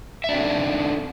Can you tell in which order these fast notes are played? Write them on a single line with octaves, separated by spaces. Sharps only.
E5 D4 C4 A4 D#4